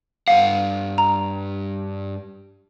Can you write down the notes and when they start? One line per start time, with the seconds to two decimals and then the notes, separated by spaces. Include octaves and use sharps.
0.27 G2 F5 F#5
0.98 A#5